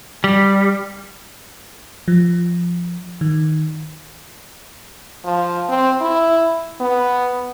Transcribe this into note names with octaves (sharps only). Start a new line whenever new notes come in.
G3
F3
D#3
F3
C4
E4
B3